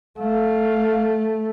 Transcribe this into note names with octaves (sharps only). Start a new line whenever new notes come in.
A3 F5